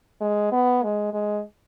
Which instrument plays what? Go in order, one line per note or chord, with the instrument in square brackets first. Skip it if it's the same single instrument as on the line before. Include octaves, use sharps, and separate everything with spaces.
[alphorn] G#3
B3
G#3
G#3